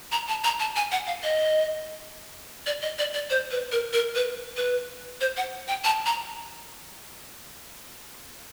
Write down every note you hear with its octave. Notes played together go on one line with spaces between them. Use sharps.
A#5
A5
A#5
A5
G#5
F#5
F5
D#5
D5
D#5
D5
D5
C5
B4
A#4
A#4
B4
B4
C5
F#5
G5
A5
A#5